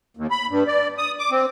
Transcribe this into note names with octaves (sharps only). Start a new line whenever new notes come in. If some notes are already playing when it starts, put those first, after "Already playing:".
D#2
B5
G2
D5
D#6
D6
C4